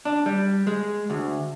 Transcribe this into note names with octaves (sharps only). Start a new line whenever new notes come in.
D4
G3
G#3
D2